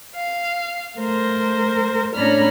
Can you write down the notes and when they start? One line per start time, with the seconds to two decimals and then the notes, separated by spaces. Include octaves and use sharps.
0.15 F5
0.97 A3 A#4 C5
2.14 A2 C#4 D4 A#5 B5 F6